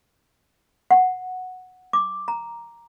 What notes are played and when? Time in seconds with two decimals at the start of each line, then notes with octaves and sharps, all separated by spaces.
0.91 F#5
1.93 D6
2.28 A#5